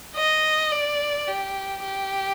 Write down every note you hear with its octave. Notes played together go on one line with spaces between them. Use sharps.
D#5
D5
G4
G4